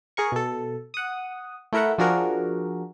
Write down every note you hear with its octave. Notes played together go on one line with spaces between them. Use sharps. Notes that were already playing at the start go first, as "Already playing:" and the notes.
G#4 A#4 C#6
B2 A4
F#5 D#6
A3 E4 A#4 E5 F#5
F3 D4 F#4 G#4 A#4